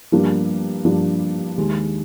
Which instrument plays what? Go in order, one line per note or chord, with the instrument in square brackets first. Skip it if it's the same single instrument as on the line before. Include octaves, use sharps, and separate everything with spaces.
[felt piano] G2 F3 A#3 D4
G2 F3 A#3 D4
D#2 D#3 G#3